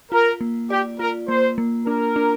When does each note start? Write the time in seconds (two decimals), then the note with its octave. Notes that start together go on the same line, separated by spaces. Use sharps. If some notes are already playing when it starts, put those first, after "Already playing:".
0.12 F4 A#4
0.41 A#3
0.70 G4 D5
0.99 F4 A#4
1.28 A#3 C5
1.58 A#3
1.86 D4 A#4
2.16 D4